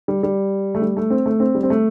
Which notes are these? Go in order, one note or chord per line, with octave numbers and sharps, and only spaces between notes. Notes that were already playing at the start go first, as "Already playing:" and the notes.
G3
G3
A3
G3
A3
C4
A3
C4
G3
C4
A3